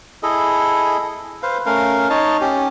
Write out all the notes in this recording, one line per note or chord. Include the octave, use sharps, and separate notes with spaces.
E4 G#4 A4 D#5
B4 C5 F5
A3 C#4 A#4 F5
D#4 C#5 D#5 A5
C#4 G4